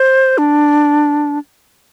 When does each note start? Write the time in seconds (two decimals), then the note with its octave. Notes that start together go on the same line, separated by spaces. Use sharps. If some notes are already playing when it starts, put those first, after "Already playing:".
Already playing: C5
0.38 D4